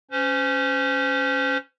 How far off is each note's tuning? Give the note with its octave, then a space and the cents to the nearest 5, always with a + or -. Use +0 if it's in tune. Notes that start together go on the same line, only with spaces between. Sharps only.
C#4 +0 C5 -35